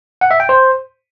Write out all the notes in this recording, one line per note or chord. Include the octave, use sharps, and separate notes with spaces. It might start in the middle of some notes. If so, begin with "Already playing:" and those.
F#5
E5
G5
C5